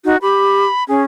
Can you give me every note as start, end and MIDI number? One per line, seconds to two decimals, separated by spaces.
0.05 0.16 63
0.05 0.17 66
0.22 0.65 67
0.22 0.84 83
0.88 1.05 61
0.88 1.01 68